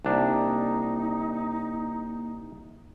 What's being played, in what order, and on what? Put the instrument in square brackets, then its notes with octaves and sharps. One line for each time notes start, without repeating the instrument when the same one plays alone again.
[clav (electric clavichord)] C2 D4 [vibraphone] A#3 A#5 [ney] D#4